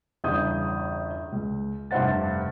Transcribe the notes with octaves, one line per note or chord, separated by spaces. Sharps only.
G1 E2 C#3 D#6 G6
C#2
F1 G2 C3 C5 F#5 A6